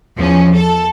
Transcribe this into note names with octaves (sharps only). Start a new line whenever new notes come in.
E2 F3 C#4
A4